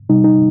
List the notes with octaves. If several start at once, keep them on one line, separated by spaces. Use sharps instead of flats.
C3 G3 D#4
D#4